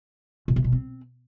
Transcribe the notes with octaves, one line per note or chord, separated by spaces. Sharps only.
B2
C3
B2
C4